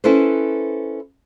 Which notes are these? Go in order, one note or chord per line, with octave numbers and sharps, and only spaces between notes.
C#4 E4 A4 B4 C5